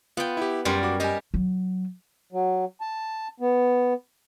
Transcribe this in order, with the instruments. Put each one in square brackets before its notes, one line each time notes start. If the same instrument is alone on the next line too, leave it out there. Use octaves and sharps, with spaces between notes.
[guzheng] B3 G5 [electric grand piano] F4
[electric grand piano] E4 G4
[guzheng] F#2 G3 A#4 [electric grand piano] D5 C6
[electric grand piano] F#4 D6
[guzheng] G3 G4 A#5 [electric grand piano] D#5 G#5
[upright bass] F#3
[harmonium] F#3
A5
B3